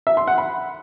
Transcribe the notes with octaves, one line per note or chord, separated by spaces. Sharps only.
E5
C6
F#5
B5